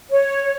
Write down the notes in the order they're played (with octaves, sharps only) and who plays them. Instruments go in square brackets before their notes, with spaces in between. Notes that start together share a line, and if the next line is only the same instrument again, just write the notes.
[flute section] C#5